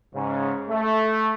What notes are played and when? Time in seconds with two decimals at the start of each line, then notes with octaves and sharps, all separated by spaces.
0.14 G#2 C#3
0.69 A3